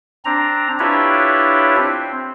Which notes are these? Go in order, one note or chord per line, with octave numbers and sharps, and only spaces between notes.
C4 D4 A#5
D4 E4 F4 G4 B4 C#5
C4